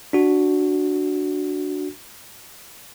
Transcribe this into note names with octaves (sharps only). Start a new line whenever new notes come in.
D4 F#4